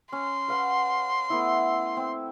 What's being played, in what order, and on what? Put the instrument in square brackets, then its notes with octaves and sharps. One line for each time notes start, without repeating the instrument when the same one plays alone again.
[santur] C#4 [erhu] C6
[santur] B4 F5 F#5
A3 B3 E4
C4